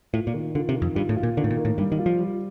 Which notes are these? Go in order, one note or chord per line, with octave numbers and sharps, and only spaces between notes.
A2 F4
A#2
D#3
D3 F4
C3
D#3
F2
G2 F4
A2
F4
A#2
D3 D#3
A2
A#2
A#3
A2
G2 G3
D#3
F4
F3
G3